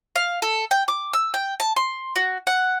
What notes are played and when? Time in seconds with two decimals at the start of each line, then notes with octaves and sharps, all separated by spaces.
0.16 F5
0.42 A4
0.71 G5
0.88 D6
1.13 E6
1.34 G5
1.60 A5
1.76 C6
2.16 F#4
2.47 F#5